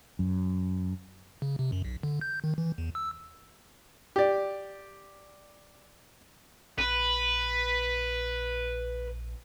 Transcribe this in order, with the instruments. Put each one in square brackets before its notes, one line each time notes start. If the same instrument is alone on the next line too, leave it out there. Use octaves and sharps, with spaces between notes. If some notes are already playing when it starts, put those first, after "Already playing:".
[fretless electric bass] F#2
[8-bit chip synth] C#3
C3
F#2
B1
D3
G6
D#3
E3
E2
E6
[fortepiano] G4 D5
[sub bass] A#1 [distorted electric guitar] B4